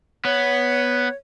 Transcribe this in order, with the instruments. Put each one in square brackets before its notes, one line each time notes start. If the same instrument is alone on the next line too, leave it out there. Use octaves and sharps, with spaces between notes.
[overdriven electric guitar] B3 [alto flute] C#5